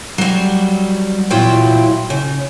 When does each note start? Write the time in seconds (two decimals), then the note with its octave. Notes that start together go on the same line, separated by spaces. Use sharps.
0.18 F#3 G3
1.30 E2 A#2 F#3 E4 F4 G5
2.10 C#3